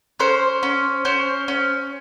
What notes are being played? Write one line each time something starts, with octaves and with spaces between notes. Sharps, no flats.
C#4 C5
C#4
C#4 C5
C#4